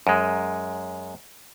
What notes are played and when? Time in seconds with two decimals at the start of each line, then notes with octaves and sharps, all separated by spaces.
0.07 F#2 G#3